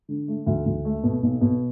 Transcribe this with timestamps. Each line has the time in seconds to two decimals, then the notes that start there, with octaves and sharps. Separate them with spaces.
0.09 D3
0.28 A3
0.47 D2
0.66 D2
0.85 A3
1.03 B2
1.23 B1
1.41 B2